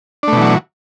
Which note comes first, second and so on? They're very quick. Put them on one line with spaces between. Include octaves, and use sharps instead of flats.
D4 A3 B2 E3 F#3